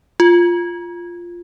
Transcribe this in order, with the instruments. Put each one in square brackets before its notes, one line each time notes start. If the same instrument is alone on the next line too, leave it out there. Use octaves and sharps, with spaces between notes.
[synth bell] F4